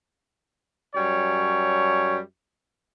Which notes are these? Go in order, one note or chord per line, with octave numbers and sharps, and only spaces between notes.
F#2 G3 C#5